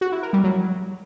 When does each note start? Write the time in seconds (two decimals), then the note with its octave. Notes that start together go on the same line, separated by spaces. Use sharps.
0.01 F#4
0.12 E4
0.22 A#4
0.33 G3
0.44 F#3